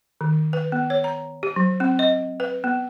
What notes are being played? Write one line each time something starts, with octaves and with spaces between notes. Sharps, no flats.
D#3
B4
B3
C#5
A#5
G4
F#3
C4
D#5
B4
B3